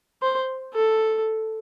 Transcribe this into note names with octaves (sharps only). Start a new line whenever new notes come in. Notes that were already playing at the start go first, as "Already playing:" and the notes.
C5
A4